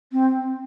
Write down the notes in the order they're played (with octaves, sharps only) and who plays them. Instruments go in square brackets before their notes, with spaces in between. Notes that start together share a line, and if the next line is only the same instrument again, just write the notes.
[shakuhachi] C4